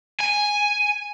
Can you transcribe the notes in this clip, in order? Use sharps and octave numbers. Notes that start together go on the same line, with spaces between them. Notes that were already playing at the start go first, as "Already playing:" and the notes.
G#5